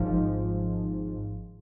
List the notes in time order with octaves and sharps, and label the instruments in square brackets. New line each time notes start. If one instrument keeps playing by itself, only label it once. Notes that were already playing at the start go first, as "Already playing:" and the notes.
Already playing: [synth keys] G#1 G#2 F3